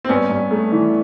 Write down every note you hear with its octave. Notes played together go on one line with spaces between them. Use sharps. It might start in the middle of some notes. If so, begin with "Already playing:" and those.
C4
G2 B3 C#4
G2
A3
E3